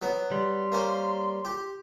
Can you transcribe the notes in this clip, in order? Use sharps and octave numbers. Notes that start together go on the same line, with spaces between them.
F#3 B3
G3 C6
A#3 C#4 C5
G4